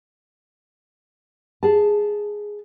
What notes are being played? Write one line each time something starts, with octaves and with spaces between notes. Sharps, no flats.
G#4 A5